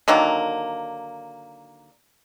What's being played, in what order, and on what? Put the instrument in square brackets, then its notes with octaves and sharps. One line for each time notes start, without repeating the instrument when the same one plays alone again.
[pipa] D3 D#3 F#3 A#3